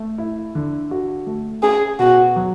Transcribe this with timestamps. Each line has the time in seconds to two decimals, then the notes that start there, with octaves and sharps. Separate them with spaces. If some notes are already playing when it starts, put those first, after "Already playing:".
Already playing: A3
0.18 E4
0.55 D3
0.91 F#4
1.27 A3
1.63 C#4 G#4
1.99 B2 F#4
2.36 F#3